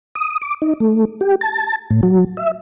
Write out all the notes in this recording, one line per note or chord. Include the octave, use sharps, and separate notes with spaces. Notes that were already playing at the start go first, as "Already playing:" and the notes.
D#6
D6
D#4
A3
G4
A5
A2
F#3
E5